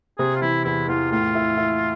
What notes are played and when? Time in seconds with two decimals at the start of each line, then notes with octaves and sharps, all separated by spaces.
0.18 C3 G#4
0.35 F4
0.41 E3 E4
0.65 E2 E4
0.88 E2 F4
1.11 A2 F4
1.35 E4
1.57 E4